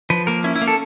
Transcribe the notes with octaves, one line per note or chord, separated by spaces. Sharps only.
F3 B4
A#3 A#4
C#4 E4
E4
A#3
A4